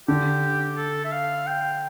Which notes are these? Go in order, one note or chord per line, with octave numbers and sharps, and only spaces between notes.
D3 G4
A4
E5
F5
G5